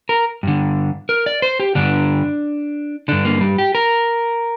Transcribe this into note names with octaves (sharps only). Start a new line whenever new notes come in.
A#4
G2 D3
A#4
D5
C5
G4
G2 D3 D4
G2 D3 D4
A#3
G3
G4
A#4